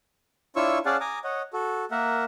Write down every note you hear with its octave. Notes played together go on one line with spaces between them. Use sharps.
D4 E4 F4 C#5 C#6 E6
C#4 G#4 D5 F5 F#5 A5
G#5 A#5 D6 D#6
C#5 D#5 F#5
F#4 A4
A#3 A#4 E5 F#5